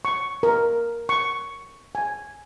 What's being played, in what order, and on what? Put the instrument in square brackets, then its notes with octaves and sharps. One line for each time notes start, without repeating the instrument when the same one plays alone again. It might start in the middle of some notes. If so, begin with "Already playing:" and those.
[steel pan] C#6
A#4
C#6
G#5